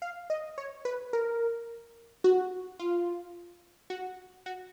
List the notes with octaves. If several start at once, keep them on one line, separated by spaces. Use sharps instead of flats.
F5
D#5
C#5
B4
A#4
F#4
F4
F#4
F#4